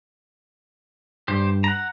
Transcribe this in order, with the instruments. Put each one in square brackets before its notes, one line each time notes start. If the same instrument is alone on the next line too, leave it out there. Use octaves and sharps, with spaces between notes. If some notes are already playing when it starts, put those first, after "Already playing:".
[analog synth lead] G2 [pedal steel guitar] G4 C5
[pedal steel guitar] F#5 A#5